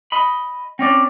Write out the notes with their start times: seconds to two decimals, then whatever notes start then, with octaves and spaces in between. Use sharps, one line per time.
0.12 D#5 B5
0.79 C4 C#4 D5